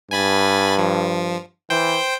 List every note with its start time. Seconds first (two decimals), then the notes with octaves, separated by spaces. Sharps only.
0.11 G2 G#5 B5 A6
0.78 F3
1.70 E3 C5 G5